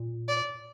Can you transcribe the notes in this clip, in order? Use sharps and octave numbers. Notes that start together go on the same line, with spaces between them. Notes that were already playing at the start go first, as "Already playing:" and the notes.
Already playing: A#2
D5